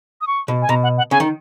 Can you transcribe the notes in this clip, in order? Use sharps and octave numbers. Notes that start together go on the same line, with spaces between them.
D#6
C#6
B2
G#5
B2 A#5
F#5
F#5
C#3 G#5
D#3